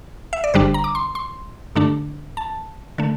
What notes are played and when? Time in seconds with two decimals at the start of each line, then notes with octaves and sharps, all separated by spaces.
0.33 E5
0.44 D5
0.54 G1 G2 D3 G3 D4 C5
0.74 A#5
0.84 D6
0.95 C6
1.15 C6
1.75 G2 D3 A3 D4
2.37 A5
2.98 D3 A3